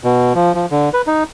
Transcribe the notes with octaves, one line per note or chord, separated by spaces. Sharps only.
B2
F3
F3
D3
B4
D#4